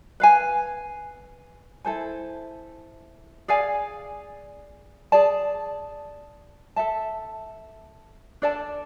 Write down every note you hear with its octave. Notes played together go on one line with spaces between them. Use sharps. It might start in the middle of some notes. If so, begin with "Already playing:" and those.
B4 F5 G#5
E4 A4 C5 G#5
G#4 D5 F5 G#5
G#4 D5 A5
A4 E5 A5
D4 A4 D5 A5